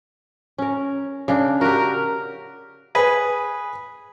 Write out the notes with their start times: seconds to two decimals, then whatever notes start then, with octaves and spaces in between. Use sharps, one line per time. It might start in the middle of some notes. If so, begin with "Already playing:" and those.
0.58 C#4 A#4
1.28 C#3 D4
1.61 F#4 G4 A#4
2.95 G#4 B4 G#5